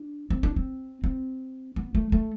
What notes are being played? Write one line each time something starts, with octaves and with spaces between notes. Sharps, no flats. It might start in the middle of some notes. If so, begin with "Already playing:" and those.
Already playing: D4
C4
D4
C4
C4
B3
A3
A3